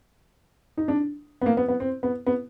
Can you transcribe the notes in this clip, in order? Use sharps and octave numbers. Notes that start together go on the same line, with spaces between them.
D#4
D4
B3
A#3
B3
B3
C4
B3
B3